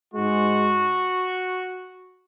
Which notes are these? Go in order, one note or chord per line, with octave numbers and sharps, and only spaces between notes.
G#2 G#3 F#4